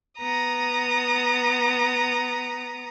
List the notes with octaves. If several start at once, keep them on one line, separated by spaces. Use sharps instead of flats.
B3 A#5 D#6